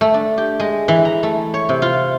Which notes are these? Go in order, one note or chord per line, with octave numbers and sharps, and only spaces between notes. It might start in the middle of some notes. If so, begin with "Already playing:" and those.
A3
D4
G4
G#3
E3
A#5
A3
C#5
C3
F4